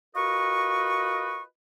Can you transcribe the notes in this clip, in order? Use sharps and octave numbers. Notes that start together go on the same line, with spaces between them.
F4 F#4 A#4 B4 D#5 C#6